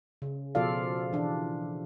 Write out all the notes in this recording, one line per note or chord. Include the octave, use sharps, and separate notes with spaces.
C#3
B2 F3 F4 A4 D5 F5
E3 D4